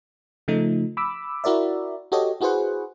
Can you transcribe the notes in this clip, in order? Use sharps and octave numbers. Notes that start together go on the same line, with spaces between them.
C#3 F3 A3 D#4
B5 D6 E6
E4 F#4 A#4 D5 E5
F#4 G4 A4 C#5 D#5
E4 F#4 G#4 B4 C5 F#5